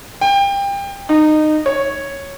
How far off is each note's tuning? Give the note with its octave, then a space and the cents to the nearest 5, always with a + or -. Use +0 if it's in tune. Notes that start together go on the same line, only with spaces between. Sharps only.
G5 +25
D#4 -20
C#5 -5